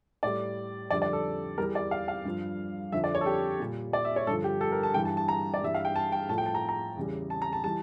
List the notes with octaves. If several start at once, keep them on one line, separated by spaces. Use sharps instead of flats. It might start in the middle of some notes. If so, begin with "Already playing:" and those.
A2 G3 D5
F2 D3 G3 D5
D5
A4
E2 E3 G3 A#4
D5
F5
F5
G2 F3
F2 D3 F3 E5
D5
C#5
A4
G4
A#2 G3
D5
E5
C#5
G2 D3 F3 A4
G4
A4
A#4
A5
G2 E3 G3 G5
A5
A5
A#5
D5
G2 E3 G3 E5
F5
G5
A5
G5
A2 F3 A5
G5
A5
A#5
A#5
E2 C#3 G3
A5
A#5
A5
E3 G3 A5